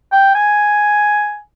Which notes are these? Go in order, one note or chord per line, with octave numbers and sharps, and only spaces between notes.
G5
G#5